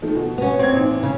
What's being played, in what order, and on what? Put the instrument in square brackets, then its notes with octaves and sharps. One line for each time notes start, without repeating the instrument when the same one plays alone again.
[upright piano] D#3 F3 A3
B2
[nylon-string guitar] B3 C#4
[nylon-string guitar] C4 [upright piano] C#5 G#6
[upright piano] A1 D#3
[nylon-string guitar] C#3